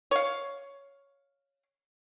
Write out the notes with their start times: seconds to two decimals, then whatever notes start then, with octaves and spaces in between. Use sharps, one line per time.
0.11 C#5 F5